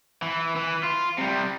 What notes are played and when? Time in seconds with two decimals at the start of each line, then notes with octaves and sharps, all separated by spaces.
0.22 E3
0.56 E3
0.83 F4
1.18 C3 G3